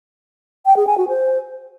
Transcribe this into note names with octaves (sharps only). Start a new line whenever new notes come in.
G5
G#4
G#5
F#4
C5